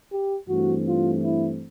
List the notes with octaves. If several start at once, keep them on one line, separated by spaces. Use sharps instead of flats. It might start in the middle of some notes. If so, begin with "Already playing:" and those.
G4
G2 E3 A3 C4 F#4
F4
E4